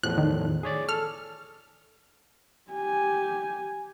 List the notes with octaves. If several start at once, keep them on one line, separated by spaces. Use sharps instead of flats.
E2 A2 F3 F#6
D#3
G#4 C#5 D5
A4 F6
G4 G#5